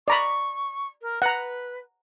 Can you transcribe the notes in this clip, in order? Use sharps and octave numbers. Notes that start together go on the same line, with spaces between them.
D5 A#5 B5 C#6
A#4
B4 F#5 A#5